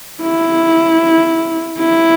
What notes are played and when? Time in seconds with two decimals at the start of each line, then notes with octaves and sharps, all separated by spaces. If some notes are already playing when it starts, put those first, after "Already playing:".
0.22 E4
1.79 E4